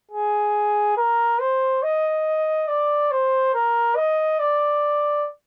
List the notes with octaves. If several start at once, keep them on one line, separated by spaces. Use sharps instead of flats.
G#4
A#4
C5
D#5
D5
C5
A#4
D#5
D5